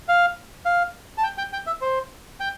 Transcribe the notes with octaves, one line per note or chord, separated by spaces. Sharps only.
F5
F5
A5
G5
G5
G5
E5
C5
G5